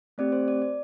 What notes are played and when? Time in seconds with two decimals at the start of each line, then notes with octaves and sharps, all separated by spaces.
0.18 A3 C4 G4 D5
0.32 C5
0.48 D5
0.62 D5